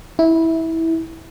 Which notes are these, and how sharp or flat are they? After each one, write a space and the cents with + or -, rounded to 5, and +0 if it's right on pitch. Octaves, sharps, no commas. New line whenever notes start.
E4 -15